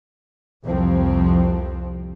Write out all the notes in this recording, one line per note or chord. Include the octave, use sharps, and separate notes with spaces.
C2 F2 F3 C4